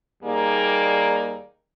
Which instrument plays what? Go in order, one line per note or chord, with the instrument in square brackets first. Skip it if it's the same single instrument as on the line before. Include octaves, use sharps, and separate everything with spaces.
[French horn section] D#2 G3 A#3 D#4 G#4 D5